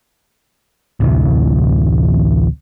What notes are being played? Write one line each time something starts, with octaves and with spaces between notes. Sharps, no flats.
A1 D2 C3 E3